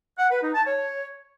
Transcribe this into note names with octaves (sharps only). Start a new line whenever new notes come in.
F#5
B4
D#4
A5
C#5